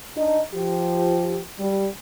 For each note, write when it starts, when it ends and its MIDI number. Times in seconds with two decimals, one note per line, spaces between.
0.17 0.40 62
0.17 0.40 63
0.54 1.39 53
0.54 1.39 67
1.59 1.87 55